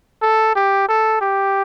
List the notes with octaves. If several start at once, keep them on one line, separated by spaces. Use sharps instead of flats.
A4
G4
A4
G4